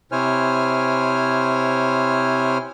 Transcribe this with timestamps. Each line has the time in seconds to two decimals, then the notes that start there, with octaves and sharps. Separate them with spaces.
0.12 C3 E4 C5 C#5 G#5 F6